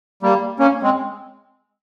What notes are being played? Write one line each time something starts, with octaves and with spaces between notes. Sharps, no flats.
G3 A#3
A#3 C#4
G#3 C4